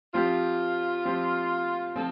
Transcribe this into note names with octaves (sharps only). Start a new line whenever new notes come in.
F3 C4 F4 G4
F3 C4 G4
F3 C4 A4